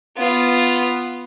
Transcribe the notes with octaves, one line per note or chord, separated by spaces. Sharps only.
B3 F4